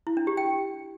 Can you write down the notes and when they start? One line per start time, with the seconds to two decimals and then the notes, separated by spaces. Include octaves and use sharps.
0.07 E4
0.17 D4
0.27 G4
0.37 G5